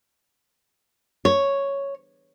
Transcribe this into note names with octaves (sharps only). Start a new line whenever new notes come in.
C#5